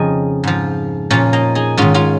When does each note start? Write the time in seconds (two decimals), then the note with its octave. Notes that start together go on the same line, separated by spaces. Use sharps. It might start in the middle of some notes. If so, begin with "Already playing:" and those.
Already playing: F2 C#3 F3 D#4 G#4
0.44 G#2 F3
1.10 A#2 F3 C#4 F4
1.33 A#3 D#4
1.55 D#4 G#4
1.77 G#2 D#3 C#4 F4
1.94 C#4 F4